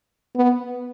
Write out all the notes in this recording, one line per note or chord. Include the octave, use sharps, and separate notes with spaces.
B3